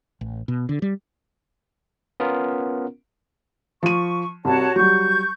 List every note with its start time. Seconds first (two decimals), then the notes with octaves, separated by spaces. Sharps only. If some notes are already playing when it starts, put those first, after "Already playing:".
0.21 A1
0.48 B2
0.69 D3
0.82 G3
2.20 B3 C#4 F4 A#4
3.83 F3 C#6 D#7
4.45 C2 C3 F#4 C#5 A5
4.76 F#3 G3 C#6 G6